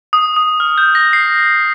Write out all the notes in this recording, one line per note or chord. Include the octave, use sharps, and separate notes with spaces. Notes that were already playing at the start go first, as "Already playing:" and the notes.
D#6
D#6
F6
G6
A#6
C7